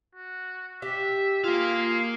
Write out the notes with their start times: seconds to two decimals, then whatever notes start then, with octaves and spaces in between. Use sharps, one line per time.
0.15 F#4
0.82 G4 E5
1.44 A#3 F4 G#4 F5